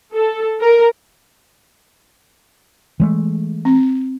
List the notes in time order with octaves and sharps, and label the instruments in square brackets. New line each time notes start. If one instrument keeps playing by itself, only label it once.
[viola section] A4
A#4
[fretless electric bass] E3 G#3 A3
[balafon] C4